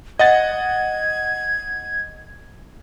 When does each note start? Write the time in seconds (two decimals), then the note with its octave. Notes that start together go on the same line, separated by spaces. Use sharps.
0.19 D#5 F#5 G#6 A6